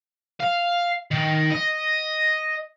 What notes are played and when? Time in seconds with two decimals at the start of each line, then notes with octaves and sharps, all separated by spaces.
0.40 F5
1.11 D#3
1.52 D#5